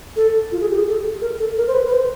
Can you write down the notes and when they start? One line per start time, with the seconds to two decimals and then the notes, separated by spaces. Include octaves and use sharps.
0.16 A4
0.52 F4
0.61 G#4
0.70 G4
0.78 G#4
0.88 A4
1.21 A#4
1.40 A4
1.57 A#4
1.67 C5
1.74 B4
1.86 B4
1.92 C5